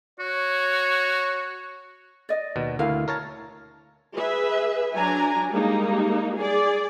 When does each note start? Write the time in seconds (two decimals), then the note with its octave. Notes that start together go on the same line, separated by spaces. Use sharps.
0.20 F#4 C#5
2.29 D5 D#5
2.56 D#2 B2
2.79 D2 E4 A#4 F5
3.08 A#4 C#5 A5
4.14 G#4 B4 E5
4.94 F#3 D4 G#5 A#5
5.50 G3 G#3 A#3 D#4
6.35 G#4 D5